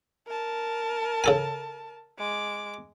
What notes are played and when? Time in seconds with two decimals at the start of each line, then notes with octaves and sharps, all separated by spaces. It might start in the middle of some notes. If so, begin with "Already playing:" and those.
0.27 A#4 A5
1.24 C#3 A4 G#5
2.18 G#3 D6